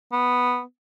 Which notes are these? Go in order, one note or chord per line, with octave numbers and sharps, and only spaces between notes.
B3